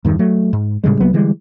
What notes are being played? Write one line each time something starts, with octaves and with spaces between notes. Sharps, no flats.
E2 G2 D#3
F#3 A3
G#2
A2 C#3 G3 G#3
C2 F#3 A#3 B3
D3 E3 G3 G#3